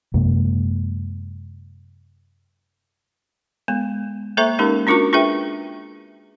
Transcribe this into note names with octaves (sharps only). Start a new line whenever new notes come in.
F#2 C3 G#3 A#3
G#3 B3
A#3 A4 C5 E5 A#5 C#6
G#3 C#4 D#4 G4 A#4
C#4 D4 F4 F#4 A#4 C#6
D4 F4 G#4 B4 E5 G5